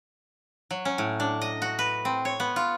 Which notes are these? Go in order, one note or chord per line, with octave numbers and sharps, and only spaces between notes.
F#3
C#4
A2
D4
D#5
F#4
B4
C4
C#5
B3
F4